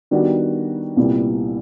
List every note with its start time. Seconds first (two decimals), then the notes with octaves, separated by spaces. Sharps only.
0.11 D#3 G3 B3 D4 F#4
0.97 C2 A#2 G3 B3 E4